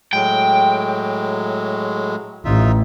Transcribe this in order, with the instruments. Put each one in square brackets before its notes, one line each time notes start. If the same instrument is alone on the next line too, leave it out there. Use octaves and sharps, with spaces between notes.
[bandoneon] A2 F#3 G#3 [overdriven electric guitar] G5
[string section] A1 [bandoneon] D#4 F4 E5